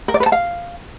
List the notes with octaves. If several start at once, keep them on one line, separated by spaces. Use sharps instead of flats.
A#4
D5
B4
A5
F5